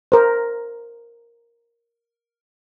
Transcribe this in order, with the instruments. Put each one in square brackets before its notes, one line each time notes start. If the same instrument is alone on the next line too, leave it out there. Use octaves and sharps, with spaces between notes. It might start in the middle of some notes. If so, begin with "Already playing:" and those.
[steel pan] A#4 C5